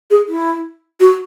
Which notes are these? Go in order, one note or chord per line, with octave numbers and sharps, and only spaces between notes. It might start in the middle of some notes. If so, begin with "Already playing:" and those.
G#4
E4
F#4